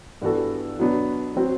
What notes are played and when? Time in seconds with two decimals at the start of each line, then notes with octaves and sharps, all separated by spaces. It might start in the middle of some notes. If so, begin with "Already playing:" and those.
0.22 G2 E3 B3 F#4 A4
0.79 B2 F#3 B3 D4
1.36 F#3 C4 F#4